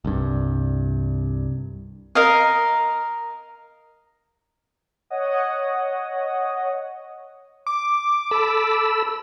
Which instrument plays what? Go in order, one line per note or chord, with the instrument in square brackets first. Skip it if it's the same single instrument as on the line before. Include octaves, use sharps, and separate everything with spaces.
[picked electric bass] C2 G2
[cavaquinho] A#4 D#5 F5
[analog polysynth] C#5 D#5 F#5 D#6
[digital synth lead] D6
[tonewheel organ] A4 B5 E6